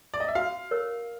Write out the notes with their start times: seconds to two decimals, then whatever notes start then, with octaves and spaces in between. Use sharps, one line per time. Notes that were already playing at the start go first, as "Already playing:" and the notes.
0.14 D5
0.20 D#5
0.28 E5
0.35 F#4 F5
0.71 A#4 C#5